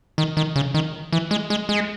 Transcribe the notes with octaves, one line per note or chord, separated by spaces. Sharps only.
D#3
D#3
C#3
D#3
E3
G#3
G#3
G#3